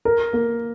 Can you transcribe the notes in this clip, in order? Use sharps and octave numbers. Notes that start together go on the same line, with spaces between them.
A#4
A#3